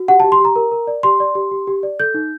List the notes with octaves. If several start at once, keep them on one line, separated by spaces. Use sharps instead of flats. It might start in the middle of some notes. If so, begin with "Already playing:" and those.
Already playing: F#4
G4 F#5
A5
G4
C6
G4 A#5
A#4
A#4
D5
G4 C6
D5
G4
G4
G4
D5
A4 G6
D#4